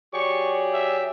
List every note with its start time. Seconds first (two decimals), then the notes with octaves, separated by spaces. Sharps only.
0.13 F#3 G4 G#4 D5 C#6
0.73 E5